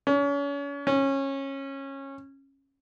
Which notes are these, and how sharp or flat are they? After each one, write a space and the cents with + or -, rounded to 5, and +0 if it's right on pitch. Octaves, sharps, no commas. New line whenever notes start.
C#4 +35
C#4 -20